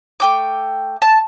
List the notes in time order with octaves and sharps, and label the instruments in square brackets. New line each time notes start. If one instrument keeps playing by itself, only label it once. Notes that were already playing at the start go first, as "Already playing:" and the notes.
[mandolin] A3 G5 D6
A5